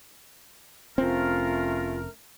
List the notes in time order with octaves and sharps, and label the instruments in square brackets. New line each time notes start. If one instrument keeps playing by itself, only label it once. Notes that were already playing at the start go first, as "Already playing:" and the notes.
[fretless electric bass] F1 C4 [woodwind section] A3 C#4 A#4 [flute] F4